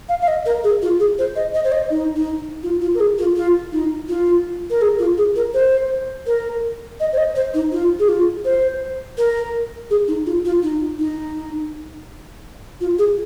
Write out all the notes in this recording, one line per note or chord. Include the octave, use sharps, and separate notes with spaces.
F5
F5
D#5
A#4
G#4
F4
G#4
C5
D#5
D#5
C5
D#5
D#4
D#4
F4
F4
A#4
G#4
F4
F4
D#4
F4
A#4
G#4
F4
G#4
A#4
C5
A#4
D#5
C5
D#5
C5
D#4
F4
G#4
F4
C5
A#4
G#4
D#4
F4
F4
D#4
D#4
F4
G#4